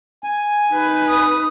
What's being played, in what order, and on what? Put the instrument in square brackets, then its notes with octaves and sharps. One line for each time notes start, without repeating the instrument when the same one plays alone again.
[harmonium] G#5
[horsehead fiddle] D#4 B4
[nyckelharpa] D#6